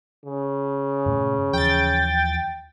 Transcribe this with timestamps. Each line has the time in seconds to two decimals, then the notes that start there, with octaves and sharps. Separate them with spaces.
0.25 C#3
1.06 G2 A#2 A3
1.53 D#2 E3 F3 G5 A6